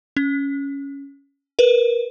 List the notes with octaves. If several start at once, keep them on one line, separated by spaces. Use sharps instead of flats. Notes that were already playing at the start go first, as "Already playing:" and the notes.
C#4
A#4 B4